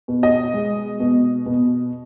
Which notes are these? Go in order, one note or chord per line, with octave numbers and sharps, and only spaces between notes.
B2
D#5
G#3
B2
B2